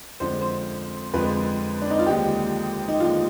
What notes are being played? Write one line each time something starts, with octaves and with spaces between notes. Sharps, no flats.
F2 D3 F3 G#3 C5
C5
F2 D3 F3 G#3 B4
D4
D#4
F4
D#2 D3 F3 G#3 G4
D#4
D#2 D3 F3 G#3 F4